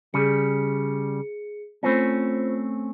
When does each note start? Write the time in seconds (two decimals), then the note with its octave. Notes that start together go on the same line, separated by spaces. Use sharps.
0.14 C#3 G3 G#4 C#7
1.83 A3 C4 C#4 F4 C5 B5